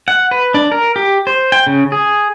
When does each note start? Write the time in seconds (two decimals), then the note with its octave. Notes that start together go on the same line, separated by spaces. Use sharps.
0.08 F#5
0.31 B4
0.54 D4
0.72 A#4
0.96 G4
1.27 C5
1.52 G5
1.67 C#3
1.92 G#4